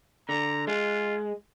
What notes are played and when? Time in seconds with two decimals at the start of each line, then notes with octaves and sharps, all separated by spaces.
0.29 D3 A#5
0.67 G#3 F4